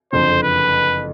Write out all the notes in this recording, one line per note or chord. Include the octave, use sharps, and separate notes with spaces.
F#1 F2 D3 C5
B4